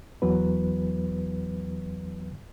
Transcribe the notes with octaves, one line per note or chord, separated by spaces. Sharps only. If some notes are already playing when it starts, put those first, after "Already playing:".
E2 E3 F#3 B3 B4